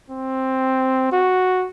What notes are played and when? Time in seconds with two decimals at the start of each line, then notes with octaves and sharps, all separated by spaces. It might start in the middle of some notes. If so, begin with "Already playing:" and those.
0.10 C4
1.13 F#4